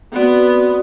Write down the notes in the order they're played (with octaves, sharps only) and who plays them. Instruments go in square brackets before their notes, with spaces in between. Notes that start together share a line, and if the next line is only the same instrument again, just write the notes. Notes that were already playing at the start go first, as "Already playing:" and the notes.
[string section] B3 [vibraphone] C4 F#4 D5